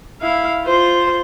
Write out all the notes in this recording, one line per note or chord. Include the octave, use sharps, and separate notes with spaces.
E4 F5
F4 C5